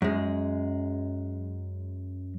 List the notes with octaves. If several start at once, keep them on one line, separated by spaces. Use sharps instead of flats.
F#2 G#3